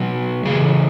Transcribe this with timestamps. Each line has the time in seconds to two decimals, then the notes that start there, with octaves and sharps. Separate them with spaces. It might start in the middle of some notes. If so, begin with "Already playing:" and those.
Already playing: B2 F#3
0.45 C#3 E3 G#3 G#4